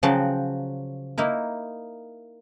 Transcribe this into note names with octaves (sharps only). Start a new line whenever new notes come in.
C#3 F3 F#3 F#4 G5 A5
A#3 D#4 E4 A#4